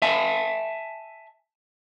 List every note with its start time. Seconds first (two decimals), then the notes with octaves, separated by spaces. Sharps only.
0.02 E5 G#5 A5